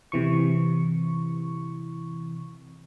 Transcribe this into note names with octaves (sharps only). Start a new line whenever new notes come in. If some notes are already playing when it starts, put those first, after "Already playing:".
C3 E3 C#6